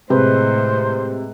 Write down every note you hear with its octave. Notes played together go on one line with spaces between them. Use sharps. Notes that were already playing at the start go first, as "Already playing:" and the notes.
A2 C3 G#3 B4 C5